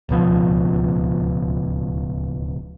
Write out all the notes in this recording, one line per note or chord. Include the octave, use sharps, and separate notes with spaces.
D1 C#2 B2 F3